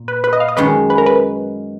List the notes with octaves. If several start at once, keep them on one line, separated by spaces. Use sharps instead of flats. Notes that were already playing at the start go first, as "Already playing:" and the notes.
Already playing: A#2
B4
B4
D#5
F5
D#5
F#2 D#3 G#3 C#4 B4
B4
A#4
B4